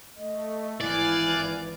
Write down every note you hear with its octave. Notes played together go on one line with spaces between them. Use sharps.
A3 D#5
G#1 E3 E4 D5 F5 G#5 F#6